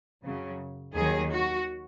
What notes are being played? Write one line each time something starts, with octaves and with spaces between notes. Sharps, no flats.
F#2 C#3 F#3
D#2 D#3 F#3 G#4
F#4